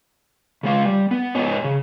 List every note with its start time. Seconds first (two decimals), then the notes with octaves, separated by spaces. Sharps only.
0.63 C#3 G#3 F5
0.85 G3
1.11 B3
1.35 G#2 C#5 D#5 G#5
1.64 C#3